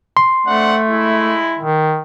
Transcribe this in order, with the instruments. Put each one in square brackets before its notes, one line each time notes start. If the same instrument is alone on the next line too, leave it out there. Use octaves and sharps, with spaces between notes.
[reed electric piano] C6
[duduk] A3 [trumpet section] C4 D4 F#5
[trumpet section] G#3 E4
[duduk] D#3